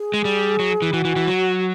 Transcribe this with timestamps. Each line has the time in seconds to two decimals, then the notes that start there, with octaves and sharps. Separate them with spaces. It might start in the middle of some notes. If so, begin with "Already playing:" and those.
Already playing: G#4
0.14 G#3
0.25 G3
0.59 F#3
0.82 E3
0.93 E3 F#4
1.05 E3
1.16 E3
1.27 F#3